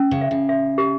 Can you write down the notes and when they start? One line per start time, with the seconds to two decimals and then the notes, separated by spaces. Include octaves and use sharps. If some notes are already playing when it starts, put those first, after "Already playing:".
Already playing: C#4
0.11 C#3
0.21 E5
0.31 C#3
0.49 E5
0.78 G4